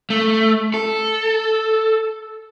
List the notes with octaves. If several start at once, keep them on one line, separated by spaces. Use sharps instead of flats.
A3
A4